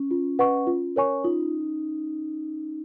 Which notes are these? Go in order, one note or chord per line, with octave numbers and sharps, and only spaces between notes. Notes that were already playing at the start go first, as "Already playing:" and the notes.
Already playing: C#4
F4
B4 D#5 F#5 C#6
F4
A#4 C#5 G#5 C#6
D#4 F4